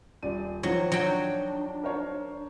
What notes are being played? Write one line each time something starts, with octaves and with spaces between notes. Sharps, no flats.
D#1 D5 D#7
D#3 F3 F#3 D#4 C5
F#3 D4 G5
A#4 C5 C#5